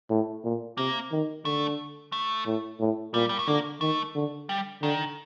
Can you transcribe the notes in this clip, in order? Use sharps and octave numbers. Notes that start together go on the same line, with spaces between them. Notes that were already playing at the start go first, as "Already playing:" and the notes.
A2
A#2
C3 A#3
D#3
D3 A3
A3
A2
A2
A#2 G3
G3
A3
D3 A#3
D#3 A3
D3
G3
D3 D#3